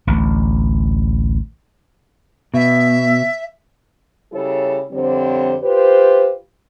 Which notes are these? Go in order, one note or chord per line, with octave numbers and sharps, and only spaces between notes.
A1 D2
B2 E5
C#3 G3 E4 A4 C#5
F2 D3 G3 C4 C5 C#5
F4 G4 B4 C5